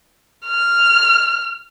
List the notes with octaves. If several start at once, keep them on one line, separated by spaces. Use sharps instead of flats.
F6